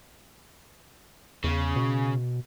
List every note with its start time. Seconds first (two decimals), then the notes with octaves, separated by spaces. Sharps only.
1.44 E2 C#3
1.76 B2